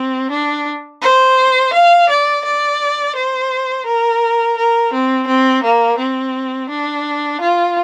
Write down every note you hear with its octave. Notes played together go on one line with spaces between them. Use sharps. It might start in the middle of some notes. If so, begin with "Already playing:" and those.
Already playing: C4
D4
C5
F5
D5
D5
C5
A#4
A#4
C4
C4
A#3
C4
D4
F4